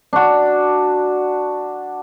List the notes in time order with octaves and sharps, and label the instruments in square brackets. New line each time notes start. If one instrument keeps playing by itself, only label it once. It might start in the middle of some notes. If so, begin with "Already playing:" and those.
[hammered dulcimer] D4 F#4